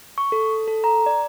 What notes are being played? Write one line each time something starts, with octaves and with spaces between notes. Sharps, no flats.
C#6
A4
A4
A#5
D5